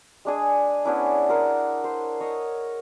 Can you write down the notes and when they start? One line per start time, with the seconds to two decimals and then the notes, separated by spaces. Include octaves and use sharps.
0.25 G#3 D4 G#4
0.85 B3 C#4 D4 E4
1.28 A#4 F#5 C6
1.84 C5
2.20 C#5 D#5